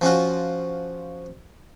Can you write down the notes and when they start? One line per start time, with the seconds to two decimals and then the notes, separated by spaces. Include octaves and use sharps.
0.01 F3 C#4 F4 F#4